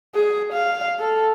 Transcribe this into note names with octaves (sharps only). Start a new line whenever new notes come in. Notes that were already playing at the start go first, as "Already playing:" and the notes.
G#4
F5
A4